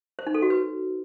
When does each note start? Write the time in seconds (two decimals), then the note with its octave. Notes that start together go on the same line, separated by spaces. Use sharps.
0.19 C5
0.27 D#4
0.34 A4
0.42 F#4
0.50 B4